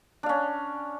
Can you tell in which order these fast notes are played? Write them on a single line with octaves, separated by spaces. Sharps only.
D4 F5 C#4